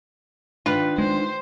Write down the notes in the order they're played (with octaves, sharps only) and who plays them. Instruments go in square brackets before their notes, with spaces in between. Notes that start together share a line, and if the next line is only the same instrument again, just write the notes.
[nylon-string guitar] D#3 D4 D#4 [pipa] F4 B4
[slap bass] G#3 [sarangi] C5